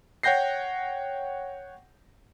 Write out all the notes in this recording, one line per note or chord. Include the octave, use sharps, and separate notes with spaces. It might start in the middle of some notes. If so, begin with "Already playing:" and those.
C#5 F#5 G5 G6 A#6 C7